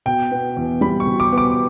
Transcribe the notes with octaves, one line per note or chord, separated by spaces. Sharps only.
B2 G5
B3
E2
G3 B5
C#6
B2
D6
B3
D6